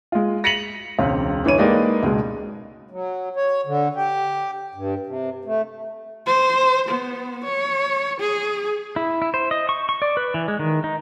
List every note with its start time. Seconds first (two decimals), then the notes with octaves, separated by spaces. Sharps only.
0.12 G#3 F4
0.44 A#6 B6 C#7 D#7 F7 F#7
0.98 E1 C#2 C4 F5
1.44 G1 E3 C#5 D#7
1.58 G#3 A#3 D#4 G4 B4 D5
2.03 C#2 B2 G#3
2.90 F#3
3.36 C#5
3.66 D3
3.95 G4
4.75 G2
5.07 C3
5.45 A3
6.27 C5
6.89 B3
7.44 C#5
8.20 G#4
8.96 E4
9.22 E4
9.34 C5
9.51 D#5
9.69 C#6
9.89 C#6
10.02 D5
10.17 B4
10.34 E3
10.48 G#3
10.59 D#3
10.84 D#4